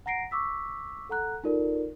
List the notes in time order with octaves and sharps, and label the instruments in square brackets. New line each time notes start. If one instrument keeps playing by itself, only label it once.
[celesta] F#5 A#5 A#6 C7 D7
C#6 D6 E6 B6
A4 F#5 A#5 F#6
D#4 F4 A4 A#4 D5